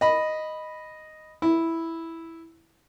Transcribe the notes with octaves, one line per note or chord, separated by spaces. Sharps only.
D#5 B5
E4